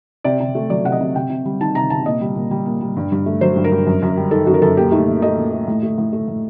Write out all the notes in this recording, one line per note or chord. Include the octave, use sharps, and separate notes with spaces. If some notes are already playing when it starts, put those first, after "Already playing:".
C3 D5
C3
A3
F#3 D5
C3 F#5
D#5
C3
C3 G5
C3
G3
D#3 A5
C3 A#5
C3 A5
A#2 D#5
G3
A#2
G3
A#2
G3
G2
G2
A3
F#3 C5
G2
A#4
G2
F#2
F#2
G3
D#3 A4
F#2 F#4
A#4
F#2 A4
A#2 G4
A3 D#4
A#2
A3 D#5
A#2
A3
A2
A3
A2
A3
A2